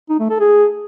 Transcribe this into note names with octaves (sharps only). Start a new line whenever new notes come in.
D#4
A3
A4
G#4